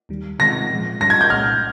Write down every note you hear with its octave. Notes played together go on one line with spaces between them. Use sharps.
D#2 D#3 G3
C3 D#3 G#3 C4 F4 A#6
A#2 F3 G#3
G2 G3 C#4 A#6
G#6
G6
C2 A#2 G#3 C#4 F6